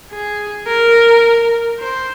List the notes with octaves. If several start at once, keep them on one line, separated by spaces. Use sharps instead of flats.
G#4
A#4
C5